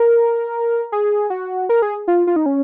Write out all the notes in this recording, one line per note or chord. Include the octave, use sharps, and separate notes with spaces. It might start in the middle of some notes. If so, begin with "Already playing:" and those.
Already playing: A#4
G#4
F#4
A#4
G#4
F4
F4
D#4
C#4